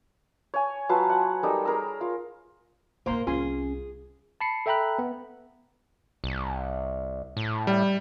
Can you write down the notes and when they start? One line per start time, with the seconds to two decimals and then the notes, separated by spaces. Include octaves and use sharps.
0.54 C#5 G#5
0.89 F#3 F4 B4 A5
1.10 F#5 G#5
1.43 G3 D#4 A4 A#4
1.65 G#4 A#4 A#5 E6
2.01 F4
3.06 A2 A#3 E4 A#4 C5 C6
3.27 C2 C#4 F4 G#4 G#5 C6
4.41 A5 B5 C7 C#7
4.66 A4 E5 G5 A#5 B5 F#6
4.99 B3
6.24 C2
7.37 A2
7.67 G3